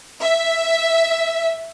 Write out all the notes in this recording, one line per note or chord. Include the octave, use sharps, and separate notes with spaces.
E5